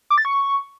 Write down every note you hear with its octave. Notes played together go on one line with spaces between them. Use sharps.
D6
A6
C#6